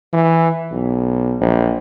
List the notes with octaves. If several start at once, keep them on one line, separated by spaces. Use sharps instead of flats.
E3
B1
A#1